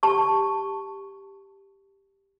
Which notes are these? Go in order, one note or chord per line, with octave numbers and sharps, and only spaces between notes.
G4 A5 C#6